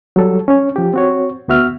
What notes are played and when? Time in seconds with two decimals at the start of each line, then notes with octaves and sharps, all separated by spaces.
0.16 F#3 G3 A4
0.48 C#4 C#5
0.76 F3 G4
0.94 C4 F#4 C#5
1.48 D2 B3 F#4 E5 F6